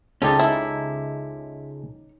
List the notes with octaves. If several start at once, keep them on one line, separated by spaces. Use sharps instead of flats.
C#2 C#3 G#3 C#4 D#4 G4 A4 A5
E4